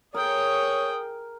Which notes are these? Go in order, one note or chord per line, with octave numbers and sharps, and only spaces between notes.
G#4 A#4 C#5 G5 D#6